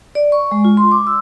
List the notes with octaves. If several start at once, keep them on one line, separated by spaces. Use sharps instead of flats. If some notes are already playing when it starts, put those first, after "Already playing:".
D5
C#6
G#3
F4
C6
D6
E6